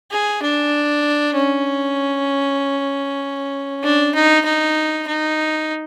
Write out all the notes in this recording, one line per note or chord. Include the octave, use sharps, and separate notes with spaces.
G#4
D4
C#4
D4
D#4
D#4
D#4